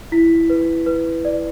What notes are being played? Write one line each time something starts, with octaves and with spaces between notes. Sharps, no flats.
E4 B6
B4
B4
D5